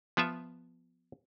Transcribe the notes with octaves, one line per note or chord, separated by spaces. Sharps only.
F3 B3 F4 E5